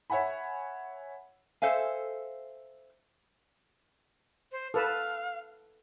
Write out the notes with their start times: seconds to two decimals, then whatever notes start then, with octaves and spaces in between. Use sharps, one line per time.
0.10 C#5 E5 F#5 G#5 B5
1.62 A4 C5 E5 F5 G#5
4.52 C5
4.74 A4 B4 F5